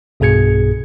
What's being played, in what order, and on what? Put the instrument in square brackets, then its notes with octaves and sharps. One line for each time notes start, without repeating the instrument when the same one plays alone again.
[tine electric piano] B1 G2 B2 G#4 G#6 C#7